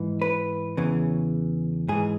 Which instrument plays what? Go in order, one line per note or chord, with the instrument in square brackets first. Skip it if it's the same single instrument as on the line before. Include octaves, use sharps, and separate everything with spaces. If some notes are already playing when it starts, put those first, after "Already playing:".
Already playing: [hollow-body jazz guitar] G#2 E3
B4
E2 C#3 E3
G#2 E3 G#4